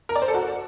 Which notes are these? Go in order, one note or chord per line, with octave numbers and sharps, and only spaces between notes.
A#4
D5
C5
A4
F#4